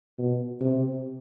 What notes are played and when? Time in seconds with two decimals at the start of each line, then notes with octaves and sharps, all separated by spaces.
0.18 B2
0.61 C3